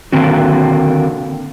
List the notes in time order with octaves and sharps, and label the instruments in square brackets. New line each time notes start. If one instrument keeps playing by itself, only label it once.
[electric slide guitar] D3 D#3 A#3 C4 F#4